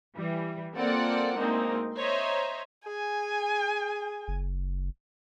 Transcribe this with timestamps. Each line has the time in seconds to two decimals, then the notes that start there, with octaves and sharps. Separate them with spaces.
0.14 E3 G3
0.75 A#3 C4 F4 A4 D5 F#5
1.37 D2 G#3 A#3 C4 D#4
1.96 C5 C#5 D#5 E5 A#5
2.86 G#4 G#5
4.28 F#1